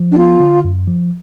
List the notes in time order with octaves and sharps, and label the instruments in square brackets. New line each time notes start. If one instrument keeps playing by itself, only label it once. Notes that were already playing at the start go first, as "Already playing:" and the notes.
Already playing: [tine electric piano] F3
[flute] D4
[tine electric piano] B3 [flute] F4
[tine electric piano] D3
F#2
F3